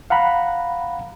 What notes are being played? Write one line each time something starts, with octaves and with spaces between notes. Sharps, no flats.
F5 F#5 A#5 B5